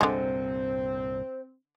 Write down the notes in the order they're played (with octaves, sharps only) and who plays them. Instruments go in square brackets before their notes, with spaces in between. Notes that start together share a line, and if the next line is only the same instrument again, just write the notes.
[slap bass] C2 G2 A#2 [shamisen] D3 G#3 [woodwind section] C4 [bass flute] C5